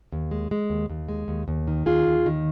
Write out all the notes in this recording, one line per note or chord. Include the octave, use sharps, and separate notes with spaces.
D#2
G#3
G#3
D#2
D#2
G#3
D#2
D#2
D#3
D#2 F4 G#4
D#2
D#3